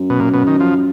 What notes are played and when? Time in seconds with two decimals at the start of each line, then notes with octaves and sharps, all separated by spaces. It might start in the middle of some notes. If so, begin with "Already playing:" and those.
Already playing: F#2
0.10 B2
0.20 A#2
0.34 B2
0.47 D#3
0.60 F3